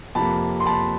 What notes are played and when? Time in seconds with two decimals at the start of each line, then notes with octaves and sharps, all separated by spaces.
0.15 F2 C3 F3 A#3 A5 B5
0.60 C6
0.66 A5 B5